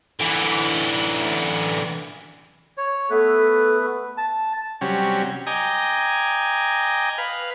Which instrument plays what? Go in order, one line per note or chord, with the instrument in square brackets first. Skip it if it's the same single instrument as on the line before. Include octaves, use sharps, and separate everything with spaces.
[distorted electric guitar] D3 E3
[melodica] C#5
[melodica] A3 B3 B4 [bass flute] A4
[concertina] A5
[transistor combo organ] C3 F#3 G3 C#4
D#5 G5 G#5 A#5 D6 D#6
B4 F5